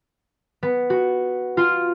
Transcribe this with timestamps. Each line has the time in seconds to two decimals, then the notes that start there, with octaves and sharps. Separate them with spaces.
0.63 B3
0.90 F#4
1.57 F4